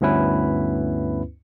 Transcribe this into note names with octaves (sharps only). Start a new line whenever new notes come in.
D2 G2 B3 C#4 E4 B4